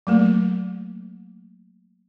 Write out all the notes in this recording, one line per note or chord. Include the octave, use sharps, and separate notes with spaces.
F#3 A3 A#3